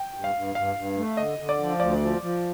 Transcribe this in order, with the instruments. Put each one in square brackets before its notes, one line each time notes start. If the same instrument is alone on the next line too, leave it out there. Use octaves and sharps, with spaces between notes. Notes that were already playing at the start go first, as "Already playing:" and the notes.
Already playing: [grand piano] G5
[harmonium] G2
[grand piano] F5
[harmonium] G2
[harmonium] G2 [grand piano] F5
[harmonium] G2
A3
[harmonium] D3 [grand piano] D#5
[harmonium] D3
[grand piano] D5
[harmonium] F3
[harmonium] D2 [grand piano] D5
[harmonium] F3
F3